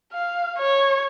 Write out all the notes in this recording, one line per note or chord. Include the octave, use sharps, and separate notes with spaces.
F5
C#5